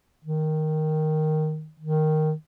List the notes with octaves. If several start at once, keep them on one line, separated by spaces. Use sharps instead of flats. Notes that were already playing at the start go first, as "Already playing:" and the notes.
D#3
D#3